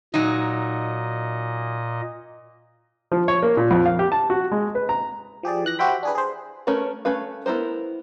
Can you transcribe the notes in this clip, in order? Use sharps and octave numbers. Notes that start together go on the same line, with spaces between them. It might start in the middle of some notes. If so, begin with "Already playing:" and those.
A#2 F#3 D#4 D#5
F3
C#5
A#3
A#2
F2
F5
G4
A5
F#4
G#3
B4
A#5
F3 G4 G#4 D5
E3 F#6 A#6
F#4 G4 C5 E5 G5 B5
D4 G#4 B4
G#4 C5
A3 C#4 A#4 B4
A3 C#4 B4 F5
B3 E4 G#4 A#4 C5